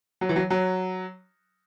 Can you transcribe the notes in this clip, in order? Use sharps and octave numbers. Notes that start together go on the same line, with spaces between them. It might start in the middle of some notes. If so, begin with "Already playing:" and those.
F#3
E3
F#3
F#3